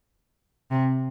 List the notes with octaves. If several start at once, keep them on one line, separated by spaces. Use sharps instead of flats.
C3